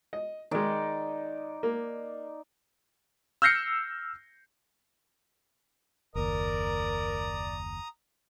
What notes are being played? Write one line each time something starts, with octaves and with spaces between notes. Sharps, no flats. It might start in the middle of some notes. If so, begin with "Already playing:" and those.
D#5
D#3 G#3 D#4 D5
A#3
E6 F6 G6 A#6 C7 C#7
F#1 D#2 A#4 D5 A#5 D#6